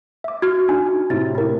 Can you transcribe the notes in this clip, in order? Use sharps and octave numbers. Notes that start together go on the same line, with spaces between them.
E5 D6
F#4 F6 G#6
D4 D#4 G#5
A2 C3 E4 A6
E4 A#4